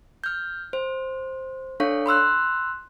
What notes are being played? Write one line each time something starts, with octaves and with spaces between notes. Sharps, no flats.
F6 G6
C5
D4 A4 C#5 F5 C#6
B5 C6 E6 F#6